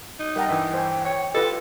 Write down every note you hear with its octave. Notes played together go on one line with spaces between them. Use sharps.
D#4
G3 A#4 D#5 F#5 G5 A5 A#5
G2 E3 E5
C5 G#5
C#5
F4 G4 A4 B4 D#5